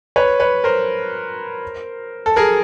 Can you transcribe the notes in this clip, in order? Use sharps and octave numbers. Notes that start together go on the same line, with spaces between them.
B4 C#5
B4 C#5
A#4 C5
A4
G#4 A#4